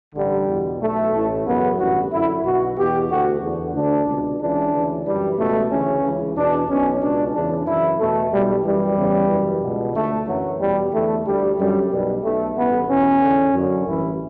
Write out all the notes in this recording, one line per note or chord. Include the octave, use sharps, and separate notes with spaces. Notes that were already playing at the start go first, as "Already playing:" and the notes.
A1 G2 D3 G3
E2 B2
B1 B2 A3
A1 A2 E3
F#2 C#3 E3 B3
A1 G2 D3 F#4
F#2 D3 E4
B1 B2 F#4
E2 B2 G4
D2 D3 F#4
E2 D3
D2 D3 D4
C#2 B2
C#2 C#3 E3 D4
D2 C#3 E3
F#2 E3 G3
C#2 B2 A3
D2 C#3 E3 C#4
C#2 C#3 E3
E2 B2 D4
B1 B2 C#4
C#2 B2 D4
E2 C#3 E3 D4
F#2 C#3 E3 E4
E2 B2 A3
B1 B2 G3
F#2 E3 G3
E2 C#3 E3
F#2 E3
C#2 B2
D2 D3 A3
F#2 E3 F#3
E2 B2 G3
E2 D3 A3
D2 D3 G3
F#2 D3 G3
B1 B2 G3
B1 B2 A3
A1 G2 E3 B3
E2 B2 C#4
E2 D3
F#2 D3
A1 G2 E3 E4